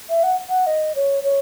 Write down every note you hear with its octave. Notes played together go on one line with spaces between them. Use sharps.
E5
F#5
F#5
D#5
C#5
C#5